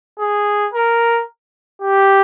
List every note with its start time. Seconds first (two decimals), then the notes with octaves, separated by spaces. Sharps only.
0.19 G#4
0.74 A#4
1.82 G4